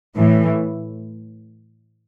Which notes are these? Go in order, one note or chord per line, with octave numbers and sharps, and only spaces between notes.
A2 E3 A3